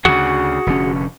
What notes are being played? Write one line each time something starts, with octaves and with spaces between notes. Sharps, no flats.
D2 C#3 F#4 G#4 F#5
F1 D3 C#4